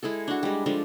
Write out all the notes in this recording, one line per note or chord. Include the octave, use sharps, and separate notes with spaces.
G#3 E4 G#4 A4
D4 F#4
G3 G#3
F3 G#3 D4 A4